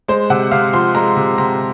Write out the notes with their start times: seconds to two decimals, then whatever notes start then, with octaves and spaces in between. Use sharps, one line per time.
0.08 G#3 C5
0.30 C3 F#5
0.52 C3 F5
0.73 F3 C6
0.95 G#3 A#5
1.16 C3
1.38 C3 A#5